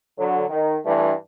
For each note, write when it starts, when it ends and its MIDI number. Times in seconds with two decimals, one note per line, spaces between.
0.17 0.44 50
0.17 0.44 54
0.49 0.76 51
0.85 1.11 43
0.85 1.11 52
0.85 1.11 57
0.85 1.11 62